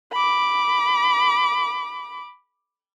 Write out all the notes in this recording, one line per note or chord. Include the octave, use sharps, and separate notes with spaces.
B5 D6